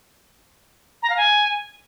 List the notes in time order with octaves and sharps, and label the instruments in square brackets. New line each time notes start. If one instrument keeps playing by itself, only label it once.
[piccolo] A#5
F5
G#5